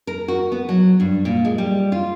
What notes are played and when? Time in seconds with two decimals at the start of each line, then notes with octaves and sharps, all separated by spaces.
0.07 A#4
0.28 F#4
0.52 B3
0.69 F#3
1.00 G2
1.25 A#2
1.45 G#3
1.58 G3
1.92 F4